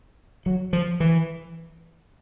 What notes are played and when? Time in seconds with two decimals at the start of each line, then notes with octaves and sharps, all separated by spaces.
0.46 F#3
0.73 F3
1.00 E3